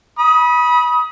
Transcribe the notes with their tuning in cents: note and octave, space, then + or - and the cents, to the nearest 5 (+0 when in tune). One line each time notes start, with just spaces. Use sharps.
B5 -20 D#6 +25